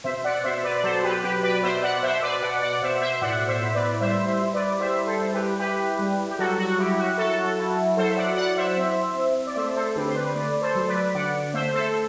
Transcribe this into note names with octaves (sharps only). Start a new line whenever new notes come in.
B2 C5 E5
D5 F#5
B2 C5 E5
E5
B4 D5
D5
F#3 A4 C5
G4 B4
B2 G4 B4
B4 D5
B2 C5 E5
D5 F#5
B2 C5 E5
B4 D5
B2 D5 F#5
D5 F#5
B2 C5 E5
C5 E5
E5
A2 D5 F#5
C5 E5
E4
B4 D5
G3 C5 E5
C5 E5
E4
B4 D5
G3 C5 E5
A4 C5
E4
G4 B4
E4 G4 B4
G3
G4
F#3 F#4 A4
F#4
E4 G4
F#4
F#3 F#4 A4
E4
F#3 A4 C5
E5
D5 F#5
E4 D5 F#5
F#5
C5 E5
C4
C4
D5
A3 C5 E5
A4 C5
D3 G4 B4
C5
B4 D5
A3 B4 D5
A4 C5
F#3
B4 D5
D3 D5 F#5
A3 C5 E5
A4 C5